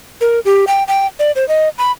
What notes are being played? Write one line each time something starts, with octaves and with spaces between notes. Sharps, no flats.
A#4
G4
G5
G5
D5
C5
D#5
B5